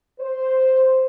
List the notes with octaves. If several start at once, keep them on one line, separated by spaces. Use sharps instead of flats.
C5